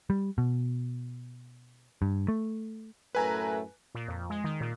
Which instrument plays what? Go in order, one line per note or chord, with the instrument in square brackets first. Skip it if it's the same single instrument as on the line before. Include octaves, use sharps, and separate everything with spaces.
[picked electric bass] G3
B2
G2
A3
[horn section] F#2 A2 A3 [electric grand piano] B4 G#5 A#5
[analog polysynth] A#2
F2
G#3
D#3
A#2